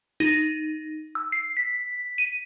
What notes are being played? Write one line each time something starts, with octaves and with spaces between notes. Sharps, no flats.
D#4
E6
C7
B6
D#7